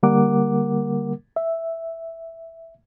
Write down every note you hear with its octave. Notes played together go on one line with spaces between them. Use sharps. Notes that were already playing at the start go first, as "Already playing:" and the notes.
D3 G3 A#3 A#4 F#5 D6
E5